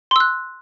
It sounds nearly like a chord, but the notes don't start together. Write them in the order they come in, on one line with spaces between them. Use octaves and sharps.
C6 E6 F#6